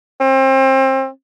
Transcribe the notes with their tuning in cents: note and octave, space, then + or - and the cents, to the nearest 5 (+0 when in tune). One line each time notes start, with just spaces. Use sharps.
C4 +30